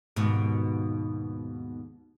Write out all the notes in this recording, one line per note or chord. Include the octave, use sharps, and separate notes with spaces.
D#2 G#2 B2